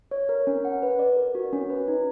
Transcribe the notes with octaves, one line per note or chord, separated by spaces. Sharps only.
C#5
A#4
C#4
F#5
B4
D5
A#4
F#4
C#4
B4
D#4